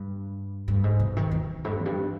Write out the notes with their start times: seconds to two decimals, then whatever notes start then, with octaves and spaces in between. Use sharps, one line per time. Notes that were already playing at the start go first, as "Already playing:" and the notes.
Already playing: G2
0.68 G2
0.84 G#2
1.00 B2
1.17 D#3
1.31 E2
1.65 G#2
1.71 G2
1.79 E2
1.86 G2